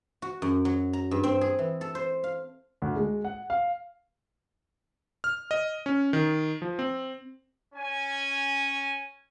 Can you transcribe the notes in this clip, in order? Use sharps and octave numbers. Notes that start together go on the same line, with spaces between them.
F#4
F#2
F#3
A#5
G2
C4
G#4
E3
A4
C5
F5
D2
G#3
F#5
F5
F6
D#5
C#4
D#3
F3
C4
C#4 G#5